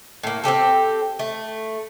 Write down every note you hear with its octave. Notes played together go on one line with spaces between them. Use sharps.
A2 A#3
C4 C#4 G4 A4
A3